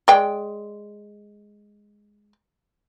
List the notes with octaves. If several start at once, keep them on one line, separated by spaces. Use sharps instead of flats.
G#3 D5 G5